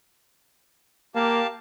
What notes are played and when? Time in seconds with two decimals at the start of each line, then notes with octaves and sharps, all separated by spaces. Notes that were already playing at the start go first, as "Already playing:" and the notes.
1.15 A#3 G4 F5 A5